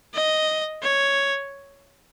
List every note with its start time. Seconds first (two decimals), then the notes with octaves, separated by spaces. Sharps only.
0.14 D#5
0.83 C#5